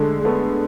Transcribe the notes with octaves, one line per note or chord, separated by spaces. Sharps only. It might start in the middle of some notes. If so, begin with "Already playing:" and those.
Already playing: D3 G#3 A3
G#3
A3 B3